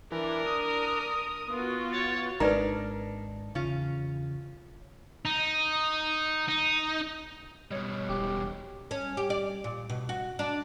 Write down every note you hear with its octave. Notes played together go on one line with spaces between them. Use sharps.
E3 D4 A#4
D#6
B3 F4 F#4
C#5 A6
G#1 G#3 D4 D#4 A#4 B4 D5 A#5
E2 C#3 C#4 F4
D#4
D#4
B2 G3 C#5 D#5
E1 G4
C#4
G4
D5
A#2
B2
F#4
D4